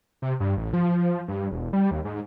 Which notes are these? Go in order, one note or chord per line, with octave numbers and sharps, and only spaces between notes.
C3
G2
A1
F3
G2
E1
G3
D#2
G#2